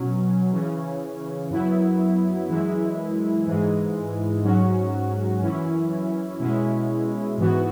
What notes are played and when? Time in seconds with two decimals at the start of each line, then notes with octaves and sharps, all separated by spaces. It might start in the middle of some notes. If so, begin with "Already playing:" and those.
Already playing: B2 F#3 C#4
0.53 C#3 E3 C#4
1.50 F#2 F#3 B3 E4
2.48 F#2 E3 G#3 E4
3.47 G#2 E3 G#3
4.44 G#2 F#3 C#4 F#4
5.42 F#2 E3 C#4 E4
6.40 B2 G#3 C#4 E4
7.38 G#2 E3 B3 F#4